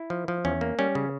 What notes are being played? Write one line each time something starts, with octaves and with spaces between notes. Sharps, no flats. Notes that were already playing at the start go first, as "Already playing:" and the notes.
Already playing: E4
F3
F3
E2 C#4
A#3
G3 C#4
C#3